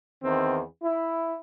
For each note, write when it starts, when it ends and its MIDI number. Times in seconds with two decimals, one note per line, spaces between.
0.23 0.60 40
0.23 0.60 51
0.23 0.60 60
0.83 1.38 64